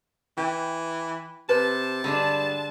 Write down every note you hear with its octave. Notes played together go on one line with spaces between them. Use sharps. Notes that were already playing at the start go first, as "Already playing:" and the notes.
E3 G5
C3 B4 A5
G2 D3 G#3 D4